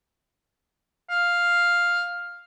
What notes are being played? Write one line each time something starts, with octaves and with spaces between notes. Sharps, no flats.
F5